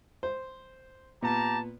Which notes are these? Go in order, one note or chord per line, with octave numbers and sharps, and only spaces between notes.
C5
A#2 B3 G4 A5 A#5